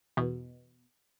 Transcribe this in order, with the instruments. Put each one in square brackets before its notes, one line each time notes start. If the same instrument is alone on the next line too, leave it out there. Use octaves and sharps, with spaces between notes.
[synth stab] E2 B2